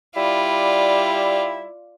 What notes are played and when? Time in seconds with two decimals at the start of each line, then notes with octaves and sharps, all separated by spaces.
0.16 G3 E4 F4 D5